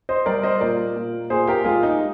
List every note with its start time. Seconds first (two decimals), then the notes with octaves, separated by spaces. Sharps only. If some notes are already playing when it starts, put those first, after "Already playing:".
0.09 C5 D#5
0.26 G3 A#4 D5
0.43 C5 D#5
0.61 A#2 A#4 D5
0.96 A#2
1.30 A#2 G#4 C5
1.47 G4 A#4
1.65 G#3 F4 G#4
1.83 D#4